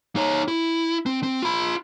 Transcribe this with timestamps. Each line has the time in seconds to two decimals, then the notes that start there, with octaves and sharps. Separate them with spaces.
0.16 D#4 C#5
0.48 E4
1.06 C4
1.23 C4
1.43 F4 B5